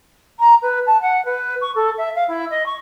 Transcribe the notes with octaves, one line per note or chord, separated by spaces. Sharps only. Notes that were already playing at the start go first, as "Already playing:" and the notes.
A#5
B4
A5
F#5
B4
C#6
A4
E5
F5
E4
D#5
C#6